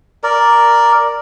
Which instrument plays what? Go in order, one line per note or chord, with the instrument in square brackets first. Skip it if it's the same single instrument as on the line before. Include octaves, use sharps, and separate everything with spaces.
[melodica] A#4 D5